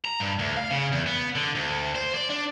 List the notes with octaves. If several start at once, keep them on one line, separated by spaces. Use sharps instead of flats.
A#5
G2
D2
F5
C#3
E2
B3
D3
D2
C5
D5
D4